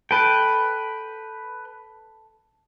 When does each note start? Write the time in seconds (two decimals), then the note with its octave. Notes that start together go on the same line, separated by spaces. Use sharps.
0.11 A4 B4 G5